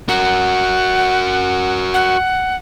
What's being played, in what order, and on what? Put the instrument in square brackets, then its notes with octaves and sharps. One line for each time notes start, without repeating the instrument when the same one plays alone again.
[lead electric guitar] F#4 A#4 [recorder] F#5
[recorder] F#5